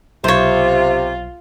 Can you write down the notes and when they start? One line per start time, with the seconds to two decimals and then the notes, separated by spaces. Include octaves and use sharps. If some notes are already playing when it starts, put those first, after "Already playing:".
0.24 B1 C3 F4 C5 C#5